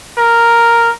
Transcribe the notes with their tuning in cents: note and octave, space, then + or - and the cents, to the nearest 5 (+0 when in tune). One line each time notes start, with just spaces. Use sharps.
A#4 +0